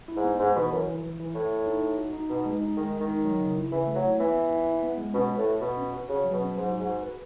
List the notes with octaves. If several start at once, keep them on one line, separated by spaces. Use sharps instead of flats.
E4
G#2
B3
G#2 D#4
B2 E3
F#2 E3
E3
E3
E3
A2 C#5
C#5
D#4
D#4
F#4
D#4
B2 D#4
G#3
D#4
D#3 G#3
G#3
D#3
D#4
F#3
C#3
E4
C#3 E3
A3
F#3
E4
E3 B3
B3
E4
E4
B3
G#3
B2 C#4
F#4
A2
B4
B2 B4
C#4
F#4
C#3 F#4
F#3
B2
C#4
G#2 F#3
F#4
G#2
F#4
B4